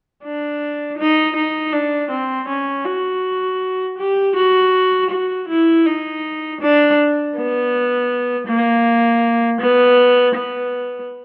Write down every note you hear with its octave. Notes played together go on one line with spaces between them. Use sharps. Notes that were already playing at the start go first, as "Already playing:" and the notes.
D4
D#4
D#4
D4
C4
C#4
F#4
G4
F#4
F#4
E4
D#4
D4
B3
A#3
B3
B3